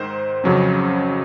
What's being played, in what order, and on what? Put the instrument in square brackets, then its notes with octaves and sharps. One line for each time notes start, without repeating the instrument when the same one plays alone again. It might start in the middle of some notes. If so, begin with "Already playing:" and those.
Already playing: [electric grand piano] G#2 D#3 C5
F2 C#3 F#3 C#4